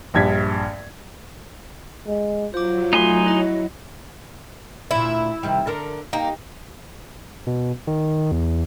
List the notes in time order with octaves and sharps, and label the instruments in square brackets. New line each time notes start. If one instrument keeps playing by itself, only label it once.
[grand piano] A#1 G2 G#6 B6
[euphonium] G#3
[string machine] F#3 [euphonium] F4 [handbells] C5 D6
[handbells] A3 [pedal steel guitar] D#4 G#5 C6
[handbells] E4 D#5
[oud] D2 A#2 [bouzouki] E4
[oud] C3 D#3 G3
D3 A4 A#4
[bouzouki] A#3 [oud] D#4 G4
[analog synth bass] B2
D#3
E2